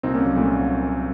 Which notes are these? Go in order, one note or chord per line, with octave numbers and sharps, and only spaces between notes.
C2 A#2 C4 D#4
A#3 C#4
F#3
C2 A#2 A3